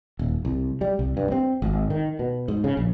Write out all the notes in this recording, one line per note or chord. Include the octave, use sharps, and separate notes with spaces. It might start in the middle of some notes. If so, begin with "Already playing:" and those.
D#1
C2
G3
C2
G2
C4
G#1
D#3
B2
G#2
C#3
A#1